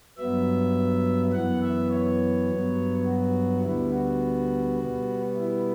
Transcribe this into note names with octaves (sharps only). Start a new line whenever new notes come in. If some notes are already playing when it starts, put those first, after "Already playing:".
G2 F#3 B3 E5
F#2 E3 B3 F#5
E5
C#5
G2 F#3 B3
F#4
D2 D3 G3 B3 E4
F#4
B2 G3 B3
E4